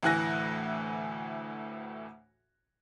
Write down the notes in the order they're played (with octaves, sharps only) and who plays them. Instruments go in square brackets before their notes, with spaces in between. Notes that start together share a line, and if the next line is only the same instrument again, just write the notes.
[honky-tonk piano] D2 A2 E3 G#5 F#6 A#6